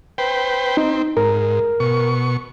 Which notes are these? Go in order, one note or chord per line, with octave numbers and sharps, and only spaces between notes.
B4 C5 G5
C4 D#4
G#2 A#4
B2 C#6